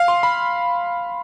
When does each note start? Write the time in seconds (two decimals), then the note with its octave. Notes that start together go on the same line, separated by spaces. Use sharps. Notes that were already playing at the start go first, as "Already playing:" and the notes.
Already playing: F5
0.08 C6
0.23 B5